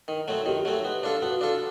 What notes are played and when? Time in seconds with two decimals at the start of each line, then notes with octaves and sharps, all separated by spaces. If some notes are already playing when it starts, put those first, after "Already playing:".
0.08 D#3
0.28 F#3 A3 C4
0.46 D#3 G4
0.65 F#3 A3 C4
0.85 B3
1.03 D4 F4 A4
1.22 B3 F#4
1.41 D4 F4 A4